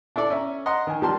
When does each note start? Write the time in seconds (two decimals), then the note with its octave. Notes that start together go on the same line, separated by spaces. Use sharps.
0.16 D4 E4 A4 D5
0.30 C#4 E5 A#5
0.66 D#5 F#5 A#5 C6
0.87 D#3 G#5
1.01 C#2 G3 A#4 A5 C6